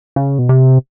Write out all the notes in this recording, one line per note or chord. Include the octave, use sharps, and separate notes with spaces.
C#3
B2
C3